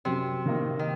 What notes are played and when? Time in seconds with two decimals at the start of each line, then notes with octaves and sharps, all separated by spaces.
0.05 F#2 C3
0.46 D#3 A#3 D#4
0.79 D#3